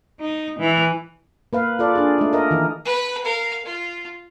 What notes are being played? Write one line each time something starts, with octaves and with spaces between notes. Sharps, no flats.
D#4
E3
A#3 B4 F5
F4 A4 D5
D4 G#4
A3 D#4
A#4 D#5
D#3 E3
B4 B5
A#4 F5
F4